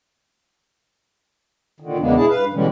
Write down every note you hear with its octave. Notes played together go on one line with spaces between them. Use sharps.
A#2 D3 D#3
E2 C#3 G#3 A#3 B3 D4
B2 E4 G#4 A5
G2 B4 F5
B2 D3 E3 G3 G#3 C#4